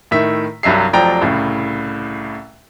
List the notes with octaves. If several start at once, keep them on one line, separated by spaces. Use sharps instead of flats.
A2 D#3 E5 B6
C2 G2 F#3 E5 C7
F1 F3 F#3 D5 G5 A#5
C2 A2 C#3